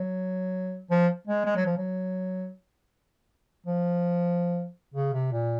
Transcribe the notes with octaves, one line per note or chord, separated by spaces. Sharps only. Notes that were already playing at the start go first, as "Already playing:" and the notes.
Already playing: F#3
F3
G#3
G#3
F#3
F3
F#3
F3
C#3
C3
A#2